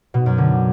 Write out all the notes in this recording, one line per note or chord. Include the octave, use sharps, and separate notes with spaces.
B2
F#2
D3